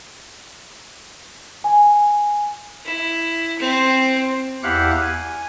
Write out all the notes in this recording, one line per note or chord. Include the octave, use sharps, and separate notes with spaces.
G#5
E4
C4
E2 E4 G4 F5 F#5 F#6
G#5